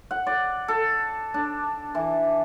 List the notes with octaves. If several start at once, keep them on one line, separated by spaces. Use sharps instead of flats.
F#5
D5
A4
D4
E3